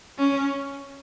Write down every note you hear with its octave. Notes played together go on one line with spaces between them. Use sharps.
C#4